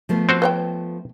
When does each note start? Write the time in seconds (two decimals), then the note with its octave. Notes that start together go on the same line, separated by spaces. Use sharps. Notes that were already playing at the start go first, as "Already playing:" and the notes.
0.09 F3 A3 B3
0.29 C4 F#4 C5
0.42 B4 C#5 G5